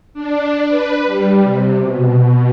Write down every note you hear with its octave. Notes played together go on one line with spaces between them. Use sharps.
D4
B4
G3
C3
B2
B2